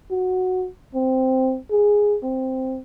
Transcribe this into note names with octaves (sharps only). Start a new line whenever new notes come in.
F#4
C4
G#4
C4